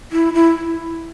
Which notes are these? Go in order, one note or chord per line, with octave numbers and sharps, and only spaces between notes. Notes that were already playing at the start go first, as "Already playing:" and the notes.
E4
E4